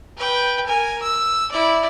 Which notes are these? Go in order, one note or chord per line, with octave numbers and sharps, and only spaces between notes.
B4 G5
A#4 G#5
E6
E4 D5